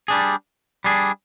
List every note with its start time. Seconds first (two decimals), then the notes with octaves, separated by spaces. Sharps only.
0.08 G3 D4 G#4
0.84 G3 D4 G#4